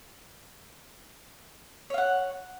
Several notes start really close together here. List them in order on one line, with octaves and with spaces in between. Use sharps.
C#5 F5 F#5